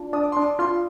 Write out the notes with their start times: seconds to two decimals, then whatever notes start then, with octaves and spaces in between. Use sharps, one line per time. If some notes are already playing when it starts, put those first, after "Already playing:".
Already playing: D4 F4
0.13 D4 D#6
0.23 D6
0.32 D4 C6
0.42 D6
0.59 F4 C6